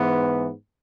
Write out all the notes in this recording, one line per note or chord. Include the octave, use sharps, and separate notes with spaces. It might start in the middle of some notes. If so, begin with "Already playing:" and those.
Already playing: G#2 E3 B3